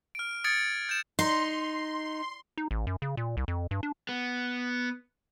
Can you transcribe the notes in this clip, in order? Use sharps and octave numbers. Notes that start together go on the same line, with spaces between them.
F6 D7
D#6 G#6 A6 C#7 D7
G6 E7
D#4 C6
D#4
A1
F#2
C#3
A#2
C2
F2
G2
D4
B3